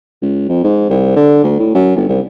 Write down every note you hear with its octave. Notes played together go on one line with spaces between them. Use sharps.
C#2
F2
G#2
C2
D3
D2
A2
F#2
G1
C2